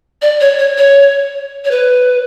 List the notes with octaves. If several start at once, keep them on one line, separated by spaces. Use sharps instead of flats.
D5
C#5
C#5
C#5
C#5
B4